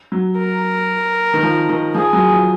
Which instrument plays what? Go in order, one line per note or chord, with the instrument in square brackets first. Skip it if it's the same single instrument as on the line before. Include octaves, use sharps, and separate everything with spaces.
[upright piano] F#3
[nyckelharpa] A#4
[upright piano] D#3
F3
D#3
[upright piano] F3 [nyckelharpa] G#4
[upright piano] F#3
F3